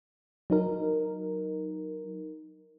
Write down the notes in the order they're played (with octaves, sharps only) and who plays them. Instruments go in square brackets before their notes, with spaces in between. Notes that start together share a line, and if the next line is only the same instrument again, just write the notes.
[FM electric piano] F#3 D#4 A#4